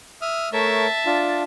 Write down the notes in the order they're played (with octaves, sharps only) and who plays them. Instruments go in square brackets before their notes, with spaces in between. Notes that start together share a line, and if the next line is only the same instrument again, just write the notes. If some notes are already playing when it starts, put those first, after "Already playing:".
[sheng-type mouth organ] E5 D#6 F6
[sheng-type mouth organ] A3 A#4 C#5 [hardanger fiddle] E5 A5
[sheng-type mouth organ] D4 F4